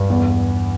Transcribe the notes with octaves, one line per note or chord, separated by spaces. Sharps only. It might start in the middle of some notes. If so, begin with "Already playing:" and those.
Already playing: G2
E2